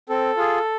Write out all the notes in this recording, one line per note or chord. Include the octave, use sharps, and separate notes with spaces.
C4 A4
F4 G#4